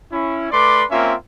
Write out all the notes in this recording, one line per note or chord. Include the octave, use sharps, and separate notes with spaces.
C#4 E4
A3 B4 D5 C6 D6
A#3 C4 C#4 F4 E5